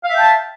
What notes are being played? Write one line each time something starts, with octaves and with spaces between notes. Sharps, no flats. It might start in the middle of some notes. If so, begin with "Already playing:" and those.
E5 F5 G5 A5